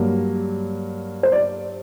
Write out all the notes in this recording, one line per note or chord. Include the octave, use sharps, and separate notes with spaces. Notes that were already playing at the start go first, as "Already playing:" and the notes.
Already playing: G2 F#3 A#3
C5
D5